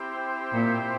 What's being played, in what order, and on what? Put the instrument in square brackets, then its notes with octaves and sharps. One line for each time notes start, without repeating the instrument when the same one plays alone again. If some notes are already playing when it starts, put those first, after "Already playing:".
Already playing: [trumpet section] C4 E4 G4 C5 G5
[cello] A#2